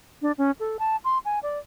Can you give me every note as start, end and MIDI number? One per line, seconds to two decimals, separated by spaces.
0.22 0.32 62
0.38 0.51 61
0.60 0.77 69
0.79 0.96 81
1.04 1.18 84
1.25 1.39 80
1.43 1.59 74